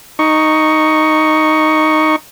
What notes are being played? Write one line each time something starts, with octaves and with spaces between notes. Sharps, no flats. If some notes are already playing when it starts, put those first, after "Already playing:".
D#4 C#6